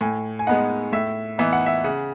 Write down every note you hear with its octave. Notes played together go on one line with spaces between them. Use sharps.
A2 G#5
G#5
G#3 B3 D#4 F#5
A2 E5
E3 B3 D#4 E5
F#5
E5
C#3 F#5